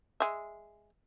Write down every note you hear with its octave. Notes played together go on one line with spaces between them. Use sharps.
G#3 E5